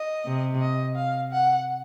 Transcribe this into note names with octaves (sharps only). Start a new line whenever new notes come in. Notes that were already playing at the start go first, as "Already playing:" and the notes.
Already playing: D#5
C3
D#5
F5
F#5